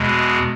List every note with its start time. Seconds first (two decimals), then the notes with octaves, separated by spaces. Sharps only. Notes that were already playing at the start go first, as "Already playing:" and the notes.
Already playing: E2 B2 G#3